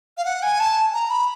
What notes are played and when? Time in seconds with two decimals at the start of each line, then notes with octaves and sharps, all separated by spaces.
0.17 F5
0.25 F#5
0.42 G#5
0.60 A5
0.94 A#5
1.10 B5